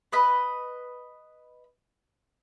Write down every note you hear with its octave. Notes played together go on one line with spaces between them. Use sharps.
B4 D#5 B5